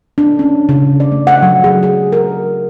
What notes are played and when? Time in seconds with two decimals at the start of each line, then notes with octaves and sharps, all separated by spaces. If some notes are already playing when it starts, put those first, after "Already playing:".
0.18 D4
0.39 C#4
0.69 C#3
1.00 D5
1.12 A3
1.27 F#5
1.42 F#3
1.64 G#4
1.83 G#4
2.12 A#4